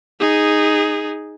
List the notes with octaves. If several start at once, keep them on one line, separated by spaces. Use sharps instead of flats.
D#4 G#4